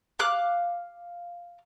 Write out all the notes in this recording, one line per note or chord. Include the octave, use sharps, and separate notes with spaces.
F5 D6 F#6